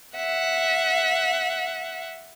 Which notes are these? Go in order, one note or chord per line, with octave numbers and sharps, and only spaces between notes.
E5 F#5